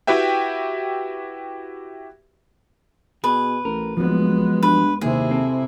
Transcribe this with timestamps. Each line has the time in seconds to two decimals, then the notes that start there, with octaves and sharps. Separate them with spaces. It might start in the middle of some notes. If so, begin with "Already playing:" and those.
0.07 E4 F#4 G4 B4 E5 G5
3.24 B2 G#4 B4
3.65 A1 A#4
3.97 D1 F3 F#3 G#3 B3
4.63 G2 B4
5.01 D#2 C3 E4 G#4
5.31 C4 A4